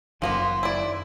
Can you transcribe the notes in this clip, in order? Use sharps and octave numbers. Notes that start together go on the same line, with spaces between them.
F#1 F#2 D#3 F3 A#3 B3 C5
E4 D5